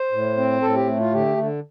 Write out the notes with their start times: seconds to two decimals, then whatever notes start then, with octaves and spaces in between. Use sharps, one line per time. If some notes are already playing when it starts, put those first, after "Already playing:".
Already playing: C5
0.12 A2
0.37 C4
0.61 A2 A4
0.74 G4
0.87 A3
1.00 F4
1.12 D3 G4
1.37 D3